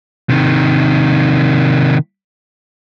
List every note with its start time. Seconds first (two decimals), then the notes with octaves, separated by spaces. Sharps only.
0.30 C3 D#3